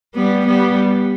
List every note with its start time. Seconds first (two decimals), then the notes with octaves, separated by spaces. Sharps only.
0.14 G3 B3
0.46 G3 B3